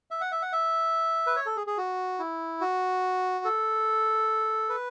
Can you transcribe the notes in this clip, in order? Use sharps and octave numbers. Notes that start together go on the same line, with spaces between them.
E5
F#5
E5
F#5
E5
B4
C#5
A4
G#4
G#4
F#4
E4
F#4
A4
B4